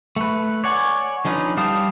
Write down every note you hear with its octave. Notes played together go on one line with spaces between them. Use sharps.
A3 B4
C#5 D5 F#5 G#5
D3 F3 C#4 D#4 B4
G3 F5 G5 A5 D#6